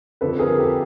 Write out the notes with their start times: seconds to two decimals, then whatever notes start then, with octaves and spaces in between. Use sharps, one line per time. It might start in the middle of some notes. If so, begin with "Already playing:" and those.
0.21 F2 D3 F3 A4 B4
0.39 G#4 A#4
0.58 G4 A4